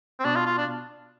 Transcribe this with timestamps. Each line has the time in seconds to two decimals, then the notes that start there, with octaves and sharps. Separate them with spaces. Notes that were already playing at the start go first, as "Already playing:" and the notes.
0.20 C4
0.25 B2 D4
0.35 F4
0.46 F4
0.58 D4